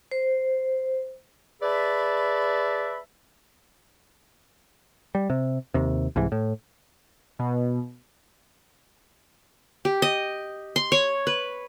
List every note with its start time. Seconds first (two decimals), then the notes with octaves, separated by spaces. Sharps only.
0.11 C5
1.62 G#4 B4 D5 E5 A5 B5
5.15 G3
5.30 C3
5.74 D#2 C3
6.16 C2 G#2 E3
6.32 A2
7.39 B2
9.85 G4
10.02 D#5
10.76 C6
10.92 C#5
11.27 B4